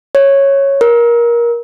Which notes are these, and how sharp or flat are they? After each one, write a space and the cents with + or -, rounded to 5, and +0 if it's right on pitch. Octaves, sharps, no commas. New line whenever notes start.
C#5 -5
A#4 +20